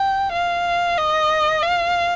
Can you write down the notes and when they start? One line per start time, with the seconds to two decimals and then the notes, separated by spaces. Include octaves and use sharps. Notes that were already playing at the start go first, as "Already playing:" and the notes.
Already playing: G5
0.32 F5
0.98 D#5
1.63 F5